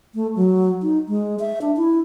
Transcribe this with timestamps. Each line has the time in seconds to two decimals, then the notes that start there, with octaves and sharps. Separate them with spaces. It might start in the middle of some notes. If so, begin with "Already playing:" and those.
0.15 A3
0.36 F#3
0.82 D#4
1.09 G#3
1.40 E5
1.61 D4
1.77 E4